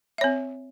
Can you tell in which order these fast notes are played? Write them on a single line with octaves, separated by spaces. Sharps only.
E5 C#5 C4